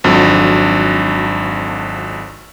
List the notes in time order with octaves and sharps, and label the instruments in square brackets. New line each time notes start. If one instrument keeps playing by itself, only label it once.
[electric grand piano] G#1 F2 F#3 D4